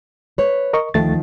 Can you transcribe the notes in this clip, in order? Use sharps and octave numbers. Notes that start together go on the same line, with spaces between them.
B4 C#5
A#4 D#5 C#6
D2 D#3 F3 A3 A6